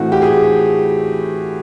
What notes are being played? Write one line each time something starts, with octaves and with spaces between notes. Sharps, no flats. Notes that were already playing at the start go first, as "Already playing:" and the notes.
Already playing: A2 E3 A3 C4 F#4
G4
G#4